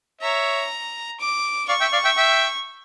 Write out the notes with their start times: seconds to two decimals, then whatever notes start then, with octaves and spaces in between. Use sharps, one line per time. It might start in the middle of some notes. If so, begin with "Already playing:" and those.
0.21 C#5 E5 A#5
1.19 D6
1.68 D5 F5 C#6
1.81 E5 G5
1.93 D5 F5
2.05 E5 G5
2.17 E5 G5